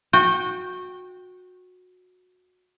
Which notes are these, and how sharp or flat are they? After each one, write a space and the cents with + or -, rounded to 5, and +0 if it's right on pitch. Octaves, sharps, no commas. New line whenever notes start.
F#4 -20 G5 +0